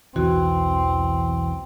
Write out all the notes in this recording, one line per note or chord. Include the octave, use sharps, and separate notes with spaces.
B1 E2 E3 C4 F#4